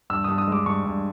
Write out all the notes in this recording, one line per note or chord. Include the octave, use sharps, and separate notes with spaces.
G2 E6
G2 D#6
D#6
G#3 D6
G2 C#6
G2